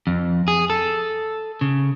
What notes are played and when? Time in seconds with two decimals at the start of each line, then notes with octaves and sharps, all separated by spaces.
0.07 F2
0.48 G#4
0.70 A4
1.61 C#3